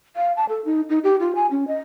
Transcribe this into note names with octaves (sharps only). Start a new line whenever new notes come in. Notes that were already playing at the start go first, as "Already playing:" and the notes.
F5
A5
A4
D#4
D#4
G4
F4
G#5
C#4
D#5